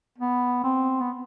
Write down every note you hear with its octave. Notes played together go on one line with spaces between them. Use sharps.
B3
C4
B3